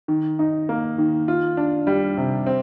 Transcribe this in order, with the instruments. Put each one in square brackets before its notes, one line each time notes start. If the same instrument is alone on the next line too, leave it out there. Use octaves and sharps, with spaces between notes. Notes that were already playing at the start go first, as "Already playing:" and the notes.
[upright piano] D#3
D#4
A#3
D#3
F4
D4
G3
C3
C4